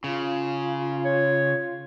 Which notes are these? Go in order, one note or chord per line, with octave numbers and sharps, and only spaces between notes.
C#3 F4
C#5